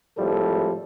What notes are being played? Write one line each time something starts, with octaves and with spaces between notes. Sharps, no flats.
G#1 A2 F3 G3 A4